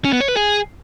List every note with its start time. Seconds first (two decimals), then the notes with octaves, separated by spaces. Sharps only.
0.05 C#4
0.13 B3
0.21 C#5
0.29 B4
0.36 G#4